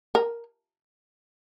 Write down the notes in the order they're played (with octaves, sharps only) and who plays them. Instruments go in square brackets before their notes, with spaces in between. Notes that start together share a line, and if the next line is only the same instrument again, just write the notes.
[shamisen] A#4